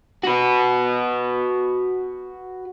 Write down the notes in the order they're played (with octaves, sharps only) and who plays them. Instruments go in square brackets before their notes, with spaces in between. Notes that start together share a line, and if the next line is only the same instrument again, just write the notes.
[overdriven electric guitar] F#4 B4